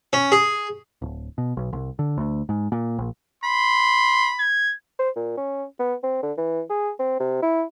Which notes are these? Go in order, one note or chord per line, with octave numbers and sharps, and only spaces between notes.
C#4
G#4
D1
B2
B1
C2
D3
D2
G#2
A#2
A#1
B5 C6
G#6
C5
A#2
C#4
B3
C4
D3
E3
G#4
C4
C3
E4